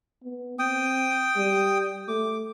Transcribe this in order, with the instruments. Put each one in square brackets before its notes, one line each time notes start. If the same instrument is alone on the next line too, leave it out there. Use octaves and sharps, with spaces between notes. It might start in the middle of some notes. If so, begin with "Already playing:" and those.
[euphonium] B3
[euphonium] C4 [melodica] G5 D#6
[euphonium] G3
[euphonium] A3 [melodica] D6